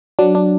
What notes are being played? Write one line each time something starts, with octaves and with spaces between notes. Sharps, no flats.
F#3 D4
D4